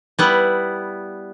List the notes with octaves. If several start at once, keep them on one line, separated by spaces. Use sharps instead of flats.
G3 B3 E4